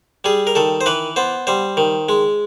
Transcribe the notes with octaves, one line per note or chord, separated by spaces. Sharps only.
G3 G#4
A#4
D#3 A4
C5
E3 B4
B3 C5
G3 C5
D#3
G#3